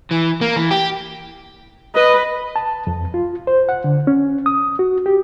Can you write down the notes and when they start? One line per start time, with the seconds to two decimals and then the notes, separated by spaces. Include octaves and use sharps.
0.11 E3
0.41 A#3
0.56 E3
0.71 G4
1.95 B4 D#5
2.56 A5
2.87 F2
3.14 F4
3.47 C5
3.69 F#5
3.84 D3
4.07 C#4
4.46 D#6
4.79 F#4
5.06 G4